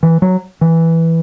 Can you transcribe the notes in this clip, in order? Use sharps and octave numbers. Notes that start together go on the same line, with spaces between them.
E3
F#3
E3